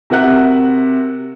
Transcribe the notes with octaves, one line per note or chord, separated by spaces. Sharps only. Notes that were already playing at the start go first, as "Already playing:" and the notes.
C3 F#4 A#4 E5 F#5 F#6